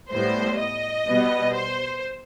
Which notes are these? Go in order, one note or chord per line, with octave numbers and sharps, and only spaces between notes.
A2 G3 B3 C5
D#5
B2 G3 B3
C5